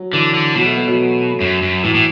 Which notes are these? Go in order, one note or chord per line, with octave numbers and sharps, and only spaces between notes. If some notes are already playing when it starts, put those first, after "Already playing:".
Already playing: F#3
D3 E3
D3
B2 F#3
A3
B3
F#3
F#2
F#2
A2 E3
A2